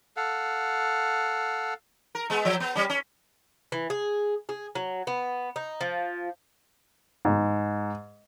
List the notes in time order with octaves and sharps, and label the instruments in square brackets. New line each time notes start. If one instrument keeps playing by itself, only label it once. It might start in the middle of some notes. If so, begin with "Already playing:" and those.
[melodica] A4 F5 F#5
[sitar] A#4
G#3 B3
F3
B3
G3 C#4
C#4
[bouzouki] E3
G#4
G#4
F#3
B3
D#4
F3
[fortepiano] G#2